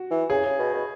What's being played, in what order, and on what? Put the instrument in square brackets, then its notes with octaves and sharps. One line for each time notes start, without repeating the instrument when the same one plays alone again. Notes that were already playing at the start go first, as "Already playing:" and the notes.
Already playing: [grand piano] F#4
[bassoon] E3
[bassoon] C#3 [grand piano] G#4
[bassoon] C#3
B2
B2